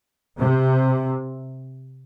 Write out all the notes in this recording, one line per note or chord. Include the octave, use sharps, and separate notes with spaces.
C3